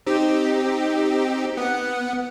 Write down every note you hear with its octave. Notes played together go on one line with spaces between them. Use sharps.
C4 D#4 G4
B3 F#5